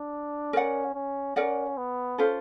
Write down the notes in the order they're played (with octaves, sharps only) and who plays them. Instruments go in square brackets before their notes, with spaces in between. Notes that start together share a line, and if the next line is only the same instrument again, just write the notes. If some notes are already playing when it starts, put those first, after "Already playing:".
Already playing: [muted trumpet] D4
[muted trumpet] C#4 [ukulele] A#4 D5 F#5
[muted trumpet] C#4
[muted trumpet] C#4 [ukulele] A#4 D5 F#5
[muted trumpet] B3
[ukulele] C#4 F4 A4 C5